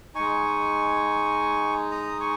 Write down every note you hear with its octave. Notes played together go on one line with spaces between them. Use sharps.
G#3 D#4 G#5 C#6
A#5 D#6
G#5 C#6